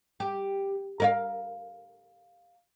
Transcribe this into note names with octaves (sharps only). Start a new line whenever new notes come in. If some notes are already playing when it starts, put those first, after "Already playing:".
G4
A#4 D5 F5